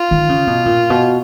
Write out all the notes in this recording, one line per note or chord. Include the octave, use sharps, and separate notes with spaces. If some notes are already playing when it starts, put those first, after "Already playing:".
Already playing: F4
D#3
C#3
B2
A#2
B2